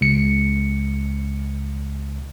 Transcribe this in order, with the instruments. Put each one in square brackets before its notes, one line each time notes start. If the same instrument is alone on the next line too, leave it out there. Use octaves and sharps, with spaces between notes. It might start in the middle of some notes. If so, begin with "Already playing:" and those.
[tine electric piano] C#2 C#7